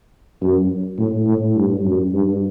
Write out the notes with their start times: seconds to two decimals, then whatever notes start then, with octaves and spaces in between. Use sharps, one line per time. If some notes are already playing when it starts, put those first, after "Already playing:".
0.42 F#2
0.99 A2
1.27 A2
1.56 G2
1.85 F#2
2.13 G2